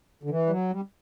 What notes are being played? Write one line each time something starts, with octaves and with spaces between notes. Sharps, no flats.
D3
E3
G3
F#3
G3